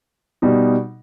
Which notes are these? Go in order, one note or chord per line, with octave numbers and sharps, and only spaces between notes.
B2 G3 D#4